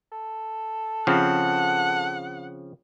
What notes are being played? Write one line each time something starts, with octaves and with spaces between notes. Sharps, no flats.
A4
C#3 F3 C4 F#5